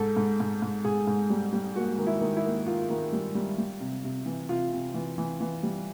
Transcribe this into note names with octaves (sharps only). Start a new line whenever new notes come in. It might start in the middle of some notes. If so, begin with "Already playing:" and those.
Already playing: G#2 A4
G#2
G#2
G#2
G#2 G#4
G#2
G3
G3
A#3 F#4
D#3
E4
D#3
E4
A#3
D#3 F4
D#3
G3
G3
G3
C3
C3
E3
C3 F4
C3
E3
E3
E3
G3